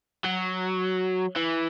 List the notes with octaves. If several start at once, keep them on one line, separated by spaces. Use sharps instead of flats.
F#3
E3